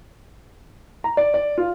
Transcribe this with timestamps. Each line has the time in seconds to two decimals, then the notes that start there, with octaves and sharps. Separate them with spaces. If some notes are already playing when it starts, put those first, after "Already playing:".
1.04 A#5
1.17 D5
1.34 D5
1.58 F4